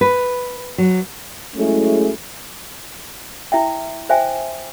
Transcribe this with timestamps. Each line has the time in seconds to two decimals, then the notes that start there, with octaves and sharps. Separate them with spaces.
0.01 B4
0.78 F#3
1.56 F#3 G#3 A3 C#4 E4 G#4
3.52 E4 E5 G5
4.09 C5 E5 G5 G#5